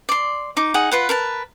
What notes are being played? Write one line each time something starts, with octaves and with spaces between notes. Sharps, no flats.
D5 C6
D#4 D6
D#4 G#4 F#5
F4 B4 F#5
A#4 B4 A5